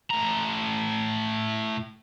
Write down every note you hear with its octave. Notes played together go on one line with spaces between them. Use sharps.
A2 A#5